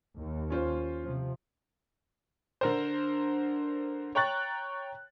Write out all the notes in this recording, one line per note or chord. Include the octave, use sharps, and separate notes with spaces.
D#2
C#4 F4 C5
C3 F3
D3 A#4 C5
C#5 G5 A#5 C#6 F#6 A6